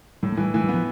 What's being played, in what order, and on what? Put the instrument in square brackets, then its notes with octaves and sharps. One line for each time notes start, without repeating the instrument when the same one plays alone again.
[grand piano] A2 [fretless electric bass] G3
[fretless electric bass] A3
[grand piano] E3 [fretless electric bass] G3
[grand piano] E3 [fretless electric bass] A3
[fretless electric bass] G3
[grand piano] B3
[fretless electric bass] F3